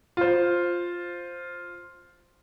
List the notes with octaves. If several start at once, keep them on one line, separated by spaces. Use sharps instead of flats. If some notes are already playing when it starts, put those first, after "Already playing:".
F4 C5